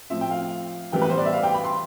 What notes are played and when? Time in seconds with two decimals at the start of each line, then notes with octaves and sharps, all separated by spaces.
0.10 A2 F3 C4 E5
0.21 G5
0.31 F5
0.92 A2 E3 G3 B3 G5
1.02 B4
1.10 C5
1.17 D5
1.26 E5
1.33 F5
1.43 G5
1.54 B5
1.64 C6